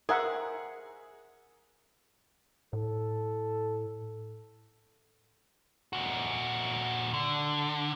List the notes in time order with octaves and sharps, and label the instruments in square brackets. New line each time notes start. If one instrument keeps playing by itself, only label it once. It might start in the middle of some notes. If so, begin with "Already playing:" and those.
[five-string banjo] G#4 C5 G5 [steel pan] A#4 E5 F#5
[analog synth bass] A2 [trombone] A4
[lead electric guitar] A#2 F#4
D3